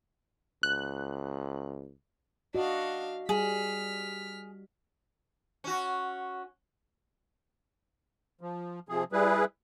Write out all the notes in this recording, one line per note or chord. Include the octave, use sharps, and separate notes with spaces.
C#2 F#6
D4 F#4 D#5 F5
G3 G#4 F6 B6
C#4 F#4
F3
C3 F3 G#4
G3 E4 G#4 B4